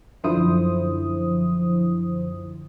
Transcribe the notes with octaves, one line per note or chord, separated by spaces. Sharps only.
F#2 D3 F3 E4 C5 D#6